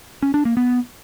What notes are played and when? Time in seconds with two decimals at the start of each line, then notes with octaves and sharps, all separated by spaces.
0.22 C#4
0.34 D4
0.45 A#3
0.57 B3